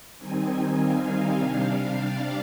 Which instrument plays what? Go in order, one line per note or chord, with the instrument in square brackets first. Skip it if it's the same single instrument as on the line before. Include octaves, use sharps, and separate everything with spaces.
[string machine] D#3 G3 C4 D#4 G#5
F5
C3 G3 D4
D5